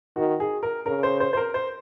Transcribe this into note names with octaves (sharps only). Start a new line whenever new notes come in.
D#3 F#4
G#4
A#4
C#3 A#4
C5
C5
C5
A#4
C5